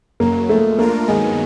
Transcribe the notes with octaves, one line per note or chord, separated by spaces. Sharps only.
F#2 C#3 F#3 A#3
G#2 F3 G#3 A3
A3 A#3 D4 F4 A#4
G2 D#3 F#3 G#3 B3 D#4